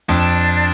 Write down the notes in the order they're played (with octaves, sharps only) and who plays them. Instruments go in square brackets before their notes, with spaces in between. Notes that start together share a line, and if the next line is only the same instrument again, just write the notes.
[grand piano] F2 [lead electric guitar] D4